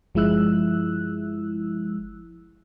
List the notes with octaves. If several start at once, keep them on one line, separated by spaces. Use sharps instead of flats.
G1 F3 G#3 E4 E6 F#6